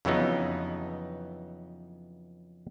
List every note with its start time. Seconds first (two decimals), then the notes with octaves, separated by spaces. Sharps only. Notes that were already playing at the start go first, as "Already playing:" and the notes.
0.05 F2 C#3 E3 F#3 B3 D#4